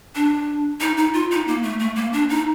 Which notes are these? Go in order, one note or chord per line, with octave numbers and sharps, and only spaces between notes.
D4
D#4
D#4
F4
D#4
A#3
A3
A3
A#3
D4
D#4